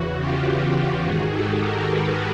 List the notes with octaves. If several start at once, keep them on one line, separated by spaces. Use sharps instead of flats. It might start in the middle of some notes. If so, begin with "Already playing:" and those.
Already playing: E2 C#3 E3 F#4
F4 G4
G#2 D#3 F#4 G#4
G4 A4
G#4 A#4
A4 B4